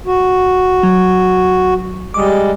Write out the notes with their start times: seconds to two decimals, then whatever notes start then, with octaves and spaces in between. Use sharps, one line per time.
0.06 F#4
0.83 F#3
2.14 G3 G#3 D6 D#6